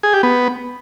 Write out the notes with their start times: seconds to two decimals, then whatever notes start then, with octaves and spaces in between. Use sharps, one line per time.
0.03 G#4
0.13 G4
0.23 B3